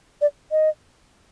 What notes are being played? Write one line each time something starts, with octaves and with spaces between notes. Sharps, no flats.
D5
D#5